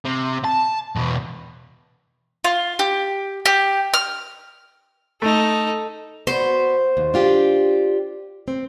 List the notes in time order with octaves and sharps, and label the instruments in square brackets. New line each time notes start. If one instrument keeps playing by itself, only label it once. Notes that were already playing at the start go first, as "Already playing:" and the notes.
[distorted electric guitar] C3
A5
E2 B2
[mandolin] F4
G4
G4
F6
[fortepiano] A3 [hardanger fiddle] D#4 A4
[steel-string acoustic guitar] B3 F#4 [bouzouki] C5
[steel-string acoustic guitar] D#2
D4 F4 G4
C4